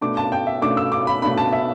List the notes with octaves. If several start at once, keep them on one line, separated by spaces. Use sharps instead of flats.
B2 A3 D4 D6
A5
G5
E5
B2 A3 D4 D6
E6
D6
B5
B2 A3 D4 B5
A5
E5